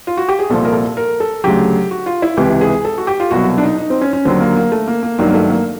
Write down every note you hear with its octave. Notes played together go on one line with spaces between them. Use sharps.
F4
F#4
G4
G#4
C2 A#2 F3 A4
A#4
A4
A#4
A4
D2 C#3 F#3 G4
F#4
F4
E4
C#2 C3 E3 G4
G#4
A4
F#4
G4
F4
C2 B2 F#3 F#4
D4
D#4
D#4
C4
C#4
C#4
D#2 D3 F#3 C4
A#3
A#3
A3
A#3
A#3
G#1 G2 D#3 F#3 A#3
A#3
A3
A#3